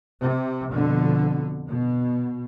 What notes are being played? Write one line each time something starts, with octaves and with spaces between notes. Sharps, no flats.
C3
F2 B2 D3
B2